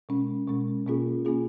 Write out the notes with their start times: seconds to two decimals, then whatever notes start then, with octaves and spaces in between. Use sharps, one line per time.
0.09 B2 G#3 C#4
0.48 B2 G#3 C#4
0.86 B2 A#3 C#4 F4 G#4
1.25 B2 A#3 C#4 F4 G#4